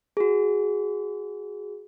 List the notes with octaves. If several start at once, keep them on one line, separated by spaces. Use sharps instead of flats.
F#4 G#4